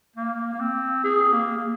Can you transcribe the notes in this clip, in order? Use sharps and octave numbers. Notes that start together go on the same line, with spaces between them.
A#3
A#3
C4
G#4
A#3
A#3